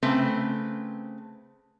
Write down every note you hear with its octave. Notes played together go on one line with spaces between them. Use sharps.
C#3 A3 C4 B4